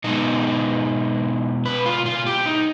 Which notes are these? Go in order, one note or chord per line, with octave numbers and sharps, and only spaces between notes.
B2 G#3 B3 D#4
B4
F4
F4
G4
D#4